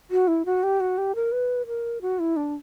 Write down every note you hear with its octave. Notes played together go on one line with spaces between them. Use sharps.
F#4
E4
F#4
G4
F#4
G4
A#4
B4
A#4
F#4
E4
D4